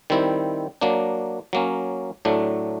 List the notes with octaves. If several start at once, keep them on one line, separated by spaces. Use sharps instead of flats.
D#3 G3 C4 E4
F#3 A#3 D4
F#3 A#3 C#4
A2 F#3 A3 D4